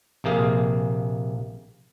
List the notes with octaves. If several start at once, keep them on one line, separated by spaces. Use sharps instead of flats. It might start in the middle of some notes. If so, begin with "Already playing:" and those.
A#1 C3 A#3 G#4 F5